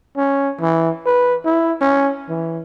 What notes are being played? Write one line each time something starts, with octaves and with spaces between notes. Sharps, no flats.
C#4
E3
B4
E4
C#4
E3